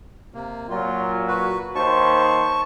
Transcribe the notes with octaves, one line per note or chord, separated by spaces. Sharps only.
C3 A#3
A#2 F#3 F4
F#4 B4
D#2 C5 A5 C#6